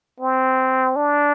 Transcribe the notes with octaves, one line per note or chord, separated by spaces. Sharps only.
C4
D4